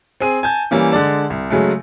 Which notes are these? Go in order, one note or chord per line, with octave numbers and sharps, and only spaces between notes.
C4 G#4 D#7
G#5 A5 G6
E3 G3 A#3 C#4
D3 G#3 D5 A5
C2
C#3 F#3 G#3 A3